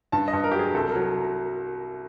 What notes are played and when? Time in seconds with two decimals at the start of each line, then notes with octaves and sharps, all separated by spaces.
0.12 G2 A5
0.28 D#5
0.33 G2
0.44 A#4
0.52 F#3 G4
0.59 G#4
0.74 C2 A4
0.90 A#4
0.95 F#3